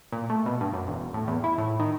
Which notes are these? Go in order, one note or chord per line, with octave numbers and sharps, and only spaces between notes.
A#2
A3
B2
G2
F#2
E1
A2
E2
E4
A2
D#3